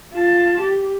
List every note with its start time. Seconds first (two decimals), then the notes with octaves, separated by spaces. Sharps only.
0.14 F4 A5
0.61 G4